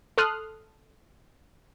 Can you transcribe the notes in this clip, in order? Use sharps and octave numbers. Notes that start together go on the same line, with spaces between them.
A4 C6 D#6 F6 F#6